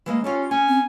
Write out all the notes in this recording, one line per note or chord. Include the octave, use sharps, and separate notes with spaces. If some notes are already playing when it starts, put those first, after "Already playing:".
E3 G#3 A#3
C#4 F4 G4 A4
C#4 G#5
C4